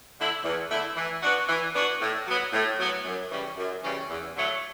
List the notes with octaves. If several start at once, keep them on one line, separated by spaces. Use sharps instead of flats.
D3 A3 E4
E2
D3 A3 E4
E3
B3 D4 F#4
E3
B3 D4 F#4
A2
F#3 B3
A2
F#3 B3
F#2
C#3 E3 G3 C#4
F#2
C#3 E3 G3 C#4
E2
D3 F#3 A3